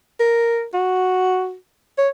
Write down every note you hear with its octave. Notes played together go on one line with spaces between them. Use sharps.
A#4
F#4
C#5